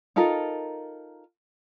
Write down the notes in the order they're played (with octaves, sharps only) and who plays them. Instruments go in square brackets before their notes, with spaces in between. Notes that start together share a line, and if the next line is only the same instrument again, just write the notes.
[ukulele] D#4 F4 A4 A#4